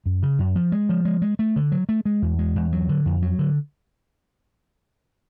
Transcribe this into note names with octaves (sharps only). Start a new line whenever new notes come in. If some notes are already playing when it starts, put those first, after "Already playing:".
F#2
C#3
F#2
F3
G#3
F3
G#3
G#3
A3
D3
F#3
A3
G#3
E2
G#3
E2
F#3
D3
F2
F#3
D3